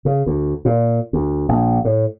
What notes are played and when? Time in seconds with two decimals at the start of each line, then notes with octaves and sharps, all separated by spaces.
0.05 C#3
0.26 D2
0.65 A#2
1.13 D2
1.49 A#1
1.85 A2